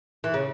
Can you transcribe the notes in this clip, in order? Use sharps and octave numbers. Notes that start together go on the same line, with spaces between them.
E3
C#3